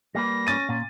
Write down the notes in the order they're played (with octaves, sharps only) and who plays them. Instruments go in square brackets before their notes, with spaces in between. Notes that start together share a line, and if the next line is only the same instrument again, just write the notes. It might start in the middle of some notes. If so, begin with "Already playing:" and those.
[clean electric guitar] G3 A#3 B4 [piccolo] A#6
[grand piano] C#4 A6 D#7
[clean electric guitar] A#2